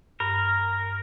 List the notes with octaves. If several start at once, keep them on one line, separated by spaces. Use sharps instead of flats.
G2 A#4